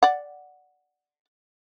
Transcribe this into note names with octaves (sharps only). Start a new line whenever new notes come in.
D5 F#5